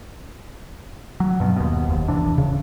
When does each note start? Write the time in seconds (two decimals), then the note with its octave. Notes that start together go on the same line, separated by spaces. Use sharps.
1.20 F#3
1.40 G2 B2
1.56 D#2 B2
1.87 F#1 D#2
2.08 A#1 C3 E3 D4
2.37 D1 C#3